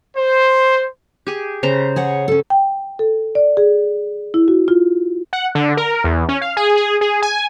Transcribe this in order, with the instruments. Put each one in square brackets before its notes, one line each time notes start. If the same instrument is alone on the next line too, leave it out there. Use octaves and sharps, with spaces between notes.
[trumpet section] C5
[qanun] G4 G#4
C#3 C5 A#5
[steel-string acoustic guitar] G#4 C#5 F#5
C#4 A4
[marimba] G5
A4
D5
G#4
E4
F#4
F4
[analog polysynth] F#5
D3
A#4
E2
C#4
F5
G#4
G#4
G#4
G#5